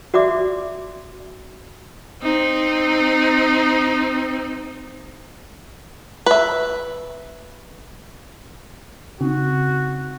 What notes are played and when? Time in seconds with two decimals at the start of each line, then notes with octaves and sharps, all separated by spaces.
0.14 F#4 D5 E5 D6
2.22 C4 D#4
6.26 B4 E5
9.21 C#3 C4 D#4 F#4